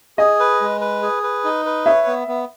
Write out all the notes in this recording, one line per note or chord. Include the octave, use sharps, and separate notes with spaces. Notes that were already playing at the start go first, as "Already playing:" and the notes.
G#4 D#5
B4
G#3
B4
G#4
B4
D#4
B4
C#5 E5
B3
B3